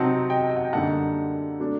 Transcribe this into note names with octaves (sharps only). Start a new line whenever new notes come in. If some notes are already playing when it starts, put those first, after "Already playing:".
Already playing: C3 F#3 C4 D#4 F#5 A5
D#5 G5
D#5
F#5
G5
F#2 D3 G3 A#3 D#4 F#5 A5
F#3 A3 D4